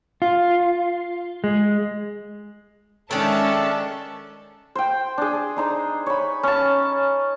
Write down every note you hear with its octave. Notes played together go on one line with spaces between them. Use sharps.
F4
G#3
D#3 G#3 C#4 D4 A4 E5 A5
C5 G5
D4 G#4
D4 D#4 C5
C#5 B5
C#4 A5